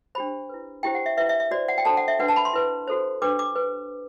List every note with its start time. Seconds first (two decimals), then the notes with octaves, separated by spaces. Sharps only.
0.15 D4 G4 C5 B5
0.49 E4 B4
0.83 E4 G4 C5 G5
0.95 F#5
1.06 E5
1.17 B4 E5
1.20 E4
1.29 E5
1.40 E5
1.51 F#4 C5 D5
1.68 F#5
1.78 G5
1.85 D4 F#4 A4 C5 A5
1.97 F#5
2.08 E5
2.19 D4 F#4 B4 F#5
2.28 A5
2.36 B5
2.45 C6
2.53 E4 B4
2.88 F#4 A4 C5
3.22 D4 G4 B4 D6
3.39 D6
3.56 B4